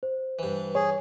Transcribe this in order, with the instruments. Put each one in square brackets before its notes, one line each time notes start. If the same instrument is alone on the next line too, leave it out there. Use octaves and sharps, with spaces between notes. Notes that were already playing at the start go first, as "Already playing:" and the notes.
[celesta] C5
[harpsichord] G2 E3
[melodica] G#4 [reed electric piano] C#5